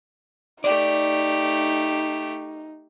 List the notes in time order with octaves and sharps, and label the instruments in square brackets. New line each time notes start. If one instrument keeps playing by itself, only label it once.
[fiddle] A3 G4 [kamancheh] D#4 [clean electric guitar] D5